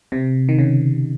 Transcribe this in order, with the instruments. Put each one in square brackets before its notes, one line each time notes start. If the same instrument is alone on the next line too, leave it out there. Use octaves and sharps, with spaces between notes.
[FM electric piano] C3
D#3
C#3